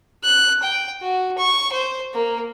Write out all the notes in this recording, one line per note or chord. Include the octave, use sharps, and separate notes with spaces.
F#6
G5
F#4
C#6
C5
A#3